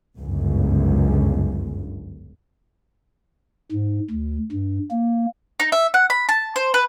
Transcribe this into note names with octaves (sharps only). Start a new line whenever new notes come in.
G1 C#2 F#2
G#2
D2
G2
A#3
D#4
E5
F#5
B5
A5
C5
B4